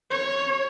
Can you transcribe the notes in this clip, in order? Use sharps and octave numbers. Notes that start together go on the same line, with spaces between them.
C#5